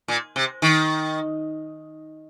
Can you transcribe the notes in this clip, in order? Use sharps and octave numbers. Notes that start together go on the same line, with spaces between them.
A#2
C3
D#3